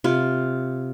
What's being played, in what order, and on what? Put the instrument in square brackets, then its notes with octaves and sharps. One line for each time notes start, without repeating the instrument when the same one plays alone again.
[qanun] C3 F4